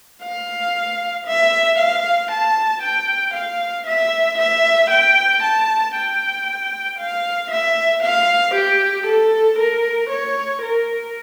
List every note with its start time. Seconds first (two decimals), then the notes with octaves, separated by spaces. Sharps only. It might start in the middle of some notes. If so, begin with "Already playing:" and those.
0.23 F5
1.27 E5
1.79 F5
2.31 A5
2.83 G5
3.34 F5
3.87 E5
4.38 E5
4.91 G5
5.43 A5
5.94 G5
6.99 F5
7.51 E5
8.03 F5
8.54 G4
9.06 A4
9.58 A#4
10.10 C#5
10.62 A#4